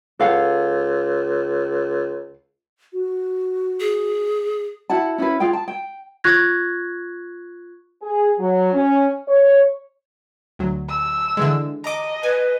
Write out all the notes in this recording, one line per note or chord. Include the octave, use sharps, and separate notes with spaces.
C#2 A4 F5 F#5
F#4
G#4
E4 F#4 F#5 A5
C#4 E4 F#4 B4
F4 G#4 F5 G5
A5
G5
F4 C#6 F#6 G#6 A#6
G#4
F#3
C#4
C#5
D2 F#3
E6
D3 E3 G#3
D#5 A#5 D6
B4 G#5